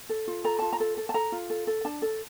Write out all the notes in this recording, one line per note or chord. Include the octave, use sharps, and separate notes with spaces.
A4
F4
A4 A#5
F4 A5
A#5
A4
A4
A5
A4 A#5
F4
A4
A4
D4 A5
A4